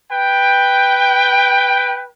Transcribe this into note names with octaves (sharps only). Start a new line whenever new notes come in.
B4 G5